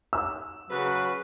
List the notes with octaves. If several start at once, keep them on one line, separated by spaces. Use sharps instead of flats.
E6
C#3 F#3 B4